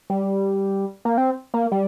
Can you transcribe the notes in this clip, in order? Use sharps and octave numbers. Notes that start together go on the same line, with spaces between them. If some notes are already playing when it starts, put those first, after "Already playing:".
G3
A#3
C4
A#3
G3